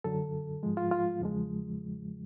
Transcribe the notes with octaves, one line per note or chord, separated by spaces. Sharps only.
F#2 D3 F#3 A4
G#2 F3 G#3
F4
F4
E2 C#3 F3 G#3